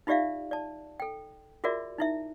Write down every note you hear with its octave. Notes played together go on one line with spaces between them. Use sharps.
D#4 F4 G4 D5 E5 F5
D5 A5
A4 G5
F4 F#4 G#4 A#4 D5 E5
D#4 E4 E5